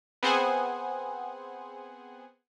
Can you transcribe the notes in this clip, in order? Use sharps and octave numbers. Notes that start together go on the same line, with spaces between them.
B3 C4 G#4 C5 F#5 G#5